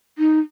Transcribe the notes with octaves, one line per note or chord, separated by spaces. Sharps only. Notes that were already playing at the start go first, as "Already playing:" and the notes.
D#4